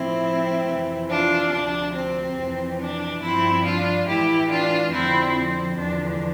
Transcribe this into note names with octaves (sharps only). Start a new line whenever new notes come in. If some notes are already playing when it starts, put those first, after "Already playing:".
Already playing: A2 F3 C4 E4
F2 C3 E3
D4 F4
D2 C3 F3 D4
C4
F2 C3 E3
D4
G2 F3 C4 E4
D4 F4
A2 E3 E4 G4
D4 F4
F2 D3 F3 C4 E4
C4
E2 D3 F3 D4